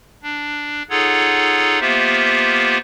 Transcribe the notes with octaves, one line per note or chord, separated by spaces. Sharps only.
D4
D#4 F4 G#4 A4 C#5 F#5
A#3 B3 F4 G4 C5 E5